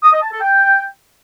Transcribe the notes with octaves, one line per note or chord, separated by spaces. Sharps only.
D#6
D#5
A5
A4
G5